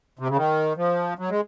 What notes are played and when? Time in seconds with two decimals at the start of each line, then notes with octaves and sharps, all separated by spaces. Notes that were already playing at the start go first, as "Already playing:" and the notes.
0.19 C3
0.29 C#3
0.36 D#3
0.77 F3
1.19 F#3
1.30 G#3